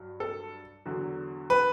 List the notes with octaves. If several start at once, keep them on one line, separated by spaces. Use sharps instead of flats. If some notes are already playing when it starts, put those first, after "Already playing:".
Already playing: G2 F#3
A4
E2 D3 F#3
B4